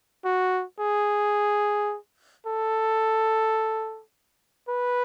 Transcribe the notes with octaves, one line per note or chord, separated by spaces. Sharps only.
F#4
G#4
A4
B4